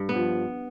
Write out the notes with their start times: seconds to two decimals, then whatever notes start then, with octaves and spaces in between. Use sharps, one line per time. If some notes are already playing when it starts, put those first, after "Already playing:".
Already playing: G2
0.09 B3
0.15 F3